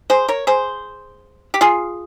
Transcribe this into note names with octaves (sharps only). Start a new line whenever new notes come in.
G#4 C5
A#4 C#5
G#4 C5
G4
F4 G#4